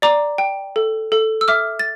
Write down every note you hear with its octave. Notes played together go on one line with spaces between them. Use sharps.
D5 A#5 D6
G5
A4
A4
E6
E5 D6 F6
A6